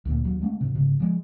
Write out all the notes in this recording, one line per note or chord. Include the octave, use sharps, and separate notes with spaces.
D2 A#2
D#2 F#3
G#3 A3 C#4
G#2 C3
G#2 C#3
F3 G#3